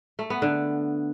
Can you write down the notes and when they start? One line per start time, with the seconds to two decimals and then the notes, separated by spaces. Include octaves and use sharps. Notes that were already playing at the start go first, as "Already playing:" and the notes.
0.19 A3
0.30 B3
0.42 D3